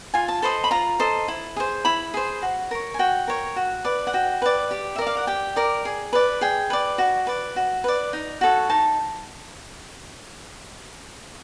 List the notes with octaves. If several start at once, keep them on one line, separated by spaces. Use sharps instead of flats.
F4 G#5
A5
A4 C5 D#5 B5
B5
F4 A#5
A4 C5 D#5
E4
G#4 C5
E4 B5
G#4 C5
F#4
A#4 C#5
G#5
F#4 G5
A#4 C#5
F#4
B4 D5
F#5
F#4 G5
B4 D5
G4
E5
A#4 D5
F5
F#5
G4 G5
A#4 D5
G#4
B4 D5
G#4 G5
B4 D5
F#4
B4 D5
F#4
B4 D5
D#4
F#4 A4 C#5
D#4 A5